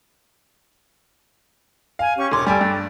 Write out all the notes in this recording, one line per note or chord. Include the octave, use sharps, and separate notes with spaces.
F5 G#5
C#4 G4 C#6
E1 C#5 C6 D6
G3 A4 G5 G#5 E6
G2